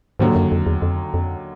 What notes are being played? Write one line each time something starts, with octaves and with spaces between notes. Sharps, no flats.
D#2 G#2 D3 F#3
F#2
F2
E2
F2
F2